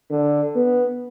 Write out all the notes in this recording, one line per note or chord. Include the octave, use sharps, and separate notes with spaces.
D3
B3